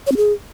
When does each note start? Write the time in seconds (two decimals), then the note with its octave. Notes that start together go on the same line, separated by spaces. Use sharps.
0.07 C#5
0.12 C4
0.17 G#4